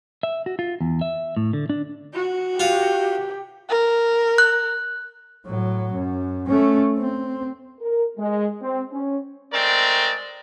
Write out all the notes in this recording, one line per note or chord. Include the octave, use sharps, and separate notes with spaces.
E5
F#4
F4
E2
E5
A2
D3
D4
F#4
F4 G4
A#4
F#6
A2 F#3
F#2
A3 C#4
C4
A#4
G#3
C4
C#4
G#3 A3 C4 A#4 D5